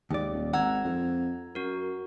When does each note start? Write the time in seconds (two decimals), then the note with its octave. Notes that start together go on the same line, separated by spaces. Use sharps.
0.10 D#2 G#2 D5
0.32 D#1
0.53 G#1 F#5 A#5 E6 G#6
0.84 F2
1.55 F#2 F#4 A#4